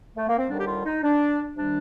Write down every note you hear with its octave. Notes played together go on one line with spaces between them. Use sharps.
A3
A#3
C4
D#2 D3 G3 D4
G4
F4
D#4
D4
C3 D#3 G3 D4